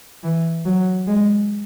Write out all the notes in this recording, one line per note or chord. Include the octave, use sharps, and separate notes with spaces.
E3
F#3
G#3